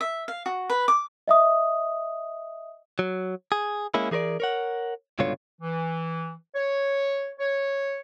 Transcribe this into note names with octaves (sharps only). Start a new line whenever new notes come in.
E5
F5
F#4
B4
D6
D#5 E5 D#6
F#3
G#4
G#3 A#3 C#4 E4
E3 G#4 A#4 C5 D5
A#4 C#5 F#5
C#2 G2 B2 D3 F4 C#5
E3
C#5
C#5